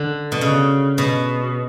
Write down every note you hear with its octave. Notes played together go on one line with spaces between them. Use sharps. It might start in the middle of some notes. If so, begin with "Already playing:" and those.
Already playing: D3
B2
C#3
B2